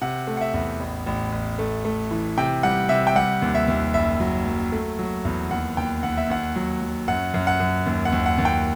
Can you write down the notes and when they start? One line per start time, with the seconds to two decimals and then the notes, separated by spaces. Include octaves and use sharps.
0.02 C3 F#5
0.27 A3
0.37 F#5
0.41 E5
0.54 E2
0.80 A1
1.06 A1
1.32 A1
1.59 A3
1.85 A3
2.11 E3
2.38 C3 G5
2.63 G3 F#5
2.89 C3 E5
3.07 G5
3.16 G3 F#5
3.42 D#2
3.55 E5
3.68 D#2
3.94 F#1 E5
4.20 F#3
4.47 F#3
4.72 A3
4.99 F#3
5.25 E2
5.51 D#2 F#5
5.77 D#2 G5
6.03 D#2 F#5
6.17 E5
6.30 D#2 F#5
6.56 F#3
6.82 F#3
7.08 F#2 F#5
7.34 F#2
7.47 F#5
7.60 F#2
7.86 D#2
8.05 F#5
8.12 D#2
8.26 F#5
8.38 D#2
8.45 G5